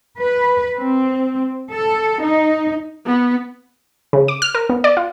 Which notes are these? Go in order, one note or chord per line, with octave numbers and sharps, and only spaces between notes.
B4
C4
A4
D#4
B3
C#3
D6
F6
A#4
B3
D5
F4